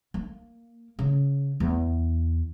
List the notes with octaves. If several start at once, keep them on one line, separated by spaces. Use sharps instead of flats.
A#3
C#3
E2